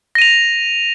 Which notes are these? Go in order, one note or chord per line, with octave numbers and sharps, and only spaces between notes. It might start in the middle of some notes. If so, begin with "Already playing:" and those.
A#6 D#7 F7